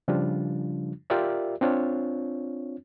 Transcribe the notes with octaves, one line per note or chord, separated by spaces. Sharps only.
C#3 F3 G3 D4 F4
F4 G4 A#4 D5 E5
C4 D4 F4 C#5